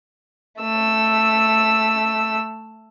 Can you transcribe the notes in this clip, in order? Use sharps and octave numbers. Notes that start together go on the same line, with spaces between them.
A3 E6